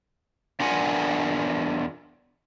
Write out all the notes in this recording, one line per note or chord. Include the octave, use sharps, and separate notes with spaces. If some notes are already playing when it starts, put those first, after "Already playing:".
E2 D4 F4 A#4 F#5 G#5